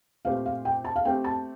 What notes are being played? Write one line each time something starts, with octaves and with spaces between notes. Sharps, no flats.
A#2 A3 C4 G4 C5 F5
F5
G5
A5
F5
A3 C4 G4 G5
A5